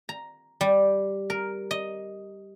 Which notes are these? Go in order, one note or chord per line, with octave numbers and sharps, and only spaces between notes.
A#5
G3
A#4
D#5